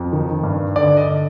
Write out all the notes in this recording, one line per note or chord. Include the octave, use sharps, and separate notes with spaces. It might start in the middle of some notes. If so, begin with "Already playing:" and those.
Already playing: F2
D#3
G2
D3 D5
D#5